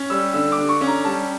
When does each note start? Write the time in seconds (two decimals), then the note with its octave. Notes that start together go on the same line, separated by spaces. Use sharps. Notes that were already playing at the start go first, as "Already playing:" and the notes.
Already playing: C#4
0.10 G3 E6
0.33 D3 E6
0.52 D6
0.58 D3
0.69 C#6
0.81 C#4
0.87 A#5
1.05 G3 A5